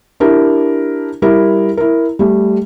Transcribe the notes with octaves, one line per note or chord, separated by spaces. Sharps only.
D4 E4 G4 A#4
G3 E4 A#4
E4 A#4
G3 A3